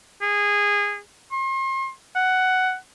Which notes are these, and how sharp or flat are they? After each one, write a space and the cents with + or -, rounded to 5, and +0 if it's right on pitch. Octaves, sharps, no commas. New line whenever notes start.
G#4 -20
C6 +40
F#5 +10